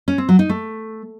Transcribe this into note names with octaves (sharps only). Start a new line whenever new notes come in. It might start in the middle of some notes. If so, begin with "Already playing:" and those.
C#4
C4
F#3
D#4
A3